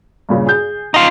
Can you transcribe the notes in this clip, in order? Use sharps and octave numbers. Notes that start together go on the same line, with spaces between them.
G2 A#2 C#3
G#4 G6
D#4 F4